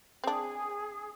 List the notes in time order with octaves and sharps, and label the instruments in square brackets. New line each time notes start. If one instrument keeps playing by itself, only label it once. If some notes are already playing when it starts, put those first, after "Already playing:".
[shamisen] C4 D4 [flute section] G#4